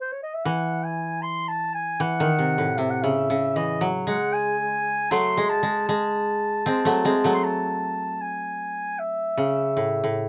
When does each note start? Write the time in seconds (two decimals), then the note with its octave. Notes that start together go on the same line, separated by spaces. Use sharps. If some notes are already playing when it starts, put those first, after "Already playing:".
0.01 C5
0.13 C#5
0.23 D#5
0.34 E5
0.45 E3 F#5
0.84 G#5
1.22 C6
1.49 A5
1.75 G#5
2.00 E3 F#5
2.20 D#3
2.39 C3
2.58 A2
2.78 C3 E5
2.90 F#5
3.03 C#3 E5
3.30 C#3
3.56 E3 D#5
3.81 F#3
4.07 G#3 F#5
4.33 G#5
5.11 F#3 A3 C6
5.37 G#3
5.49 A5
5.63 G#3
5.89 G#3 A5
6.66 G#3 C4
6.85 F#3 A3
7.05 G#3 C4
7.24 F#3 A3
7.34 C6
7.44 A5
8.21 G#5
8.99 E5
9.38 C#3
9.77 A2
10.04 A2